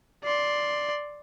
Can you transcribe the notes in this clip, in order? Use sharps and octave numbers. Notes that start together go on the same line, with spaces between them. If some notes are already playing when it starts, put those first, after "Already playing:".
D5 C6